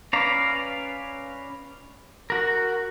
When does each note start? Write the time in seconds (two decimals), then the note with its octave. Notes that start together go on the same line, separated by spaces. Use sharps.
0.13 C#4 B4 D5 F5 A#5
2.30 F#4 A#4